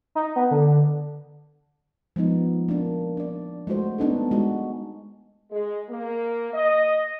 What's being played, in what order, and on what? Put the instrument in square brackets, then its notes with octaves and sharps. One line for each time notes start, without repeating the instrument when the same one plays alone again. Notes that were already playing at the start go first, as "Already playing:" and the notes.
[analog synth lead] D#4
B3
D3
[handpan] F3 G#3 B3 D#4
A#3 D4
D4 D5
G#3 A3 F#4 C5
B3 D4 D#4 A4
G#3 F#4
[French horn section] G#3
A#3
D#5